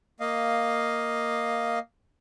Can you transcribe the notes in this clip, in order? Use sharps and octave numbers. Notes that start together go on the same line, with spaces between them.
A#3 D#5 F5